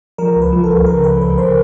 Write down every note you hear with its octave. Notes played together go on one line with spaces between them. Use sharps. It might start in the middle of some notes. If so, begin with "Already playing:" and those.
F3 A#4
C#2
B4
F3
A4
C#2
C#3 A#4
C#2 B4
C#2 B4
C#3 C5